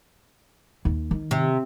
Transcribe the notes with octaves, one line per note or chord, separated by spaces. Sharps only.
D#2
D#3
C3